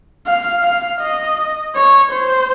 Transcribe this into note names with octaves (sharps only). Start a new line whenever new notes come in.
F5
F5
D#5
C#5
C5